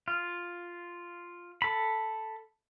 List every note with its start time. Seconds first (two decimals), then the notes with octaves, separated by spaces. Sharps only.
0.08 F4
1.62 A4 B5